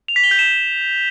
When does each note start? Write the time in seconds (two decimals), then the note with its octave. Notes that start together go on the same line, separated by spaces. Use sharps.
0.08 F7
0.16 B6
0.24 G7
0.31 G6
0.39 E7